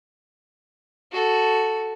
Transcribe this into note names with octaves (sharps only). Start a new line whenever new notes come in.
F#4 A4